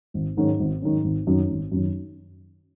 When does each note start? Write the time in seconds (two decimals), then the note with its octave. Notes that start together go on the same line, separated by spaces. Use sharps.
0.14 G#1
0.37 G#2 D#3 F#3 C#4
0.59 G#1
0.82 G#2 D#3 F#3 C#4
1.04 G#1
1.27 F#2 D#3 F#3
1.50 G#1
1.72 F#2 D#3 F#3